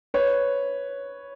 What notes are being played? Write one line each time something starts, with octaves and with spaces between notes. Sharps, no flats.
B4 C#5